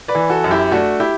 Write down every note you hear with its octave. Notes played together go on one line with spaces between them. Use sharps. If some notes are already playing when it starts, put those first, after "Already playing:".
B4 D5
E3
F#4 A4
F#2
E4 G4
A3 D4 F#4
E4 G4